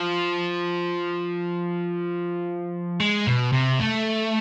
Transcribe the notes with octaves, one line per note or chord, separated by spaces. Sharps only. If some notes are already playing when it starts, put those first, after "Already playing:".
Already playing: F3
G#3
B2
C3
A3